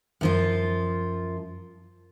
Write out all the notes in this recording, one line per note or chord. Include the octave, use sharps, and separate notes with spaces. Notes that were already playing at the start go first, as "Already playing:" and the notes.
F#2 F3 F4